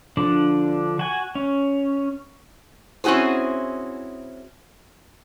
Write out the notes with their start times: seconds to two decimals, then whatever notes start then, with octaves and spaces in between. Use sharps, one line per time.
0.17 D3 F3 D4
0.99 F#4 G#5
1.35 C#4
3.04 C4 C#4 E4 F#4 G#4 C5